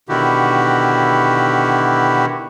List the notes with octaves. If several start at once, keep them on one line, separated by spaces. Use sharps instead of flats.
B2 D3 D#3 E4 F#4 G4